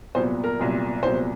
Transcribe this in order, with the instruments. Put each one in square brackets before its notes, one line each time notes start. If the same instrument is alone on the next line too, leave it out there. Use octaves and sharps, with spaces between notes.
[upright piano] C2 A#2 F#3 B3 C5
A#4
C2 A#2 F#3 B3
C2 A#2 F#3 B3 C5